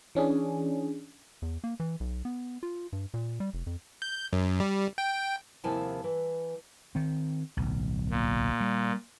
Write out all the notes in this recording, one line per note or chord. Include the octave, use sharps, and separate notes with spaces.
E3 C#4 D4 G#4
E2
A#3
E3
B1
B3
F4
G2
A#2
G3
F1
F2
G6
F#2
G3
G5
D#2 C3 F3 E4 G#5 A5
E3
D#3 C4
D1 B1
A#2
G3